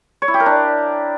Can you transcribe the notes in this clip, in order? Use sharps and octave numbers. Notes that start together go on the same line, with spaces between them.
C#5
E4
G4
A#4
D4